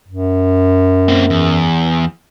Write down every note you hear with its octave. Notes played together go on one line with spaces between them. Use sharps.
F#2
A#3 C4
E2